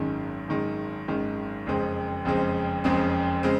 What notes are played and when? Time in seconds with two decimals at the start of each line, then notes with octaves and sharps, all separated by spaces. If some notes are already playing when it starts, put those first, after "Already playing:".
Already playing: G#1 F#2 D#3 G#3
0.48 G#1 F#2 D#3 G#3
1.08 G#1 F#2 D#3 G#3
1.66 F#1 F2 C#3 G#3 C4
2.25 F#1 F2 C#3 G#3 C4
2.84 F#1 F2 C#3 G#3 C4
3.43 C#3 G#3 C4